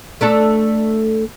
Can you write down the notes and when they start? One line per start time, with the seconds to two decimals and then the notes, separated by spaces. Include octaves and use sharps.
0.21 A3 D4 A4